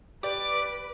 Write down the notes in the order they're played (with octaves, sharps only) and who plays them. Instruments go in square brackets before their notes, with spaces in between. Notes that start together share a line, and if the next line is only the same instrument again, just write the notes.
[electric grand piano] G4 D5 [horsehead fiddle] B4 [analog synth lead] D6